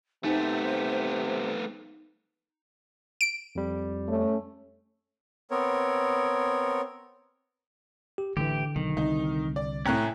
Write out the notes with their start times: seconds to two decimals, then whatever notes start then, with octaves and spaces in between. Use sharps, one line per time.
0.24 C3 A3 B3 D#4 C5
3.21 D7
3.55 F2 G3
4.08 A3 C#4
5.51 B3 C4 A#4 C#5
8.18 G4
8.37 A1 D3 E3 G4
8.76 B1 D#3
8.97 C2 D#4
9.56 D5
9.86 A2 C3 A3 C#4 G5 A#5 F#6